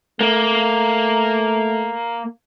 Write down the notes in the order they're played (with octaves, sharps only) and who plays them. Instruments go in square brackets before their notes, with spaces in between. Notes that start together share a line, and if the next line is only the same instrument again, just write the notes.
[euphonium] A3 [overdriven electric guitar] A#3